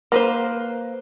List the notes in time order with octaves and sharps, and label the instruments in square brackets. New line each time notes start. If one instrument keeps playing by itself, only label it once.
[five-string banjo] A#3 B4 C5